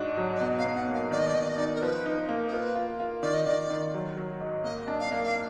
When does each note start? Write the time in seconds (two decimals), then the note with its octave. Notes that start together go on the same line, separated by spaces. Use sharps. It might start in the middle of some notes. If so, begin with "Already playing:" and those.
Already playing: G#2 D4 F#4
0.17 F#3
0.36 D5
0.40 B2 D#5
0.58 F5
0.64 B2
0.76 F#5
0.88 A#3
0.94 F5
1.11 D#3 D5
1.19 D#5
1.27 D5
1.34 D#3 D#5
1.41 D5
1.49 D#5
1.56 D#4 D5
1.75 A#4
1.82 F3 B4
2.06 D#4
2.29 A#3
2.48 A#4
2.52 F4 B4
2.75 F4
3.00 F4
3.22 D#3 D5
3.34 D#5
3.45 D#3 D5
3.70 D#3
3.94 F#3
4.17 F#3
4.40 G#2
4.64 A#3 D#5
4.88 D4
5.00 F5
5.11 A#3
5.24 F5